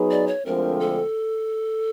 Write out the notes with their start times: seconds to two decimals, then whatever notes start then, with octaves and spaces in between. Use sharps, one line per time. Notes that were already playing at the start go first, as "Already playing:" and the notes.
Already playing: F#3 B3 D#4 G#4 B4
0.11 D5
0.27 C#5
0.46 D2 D3 F3 G#3 C4 A#4
0.80 A4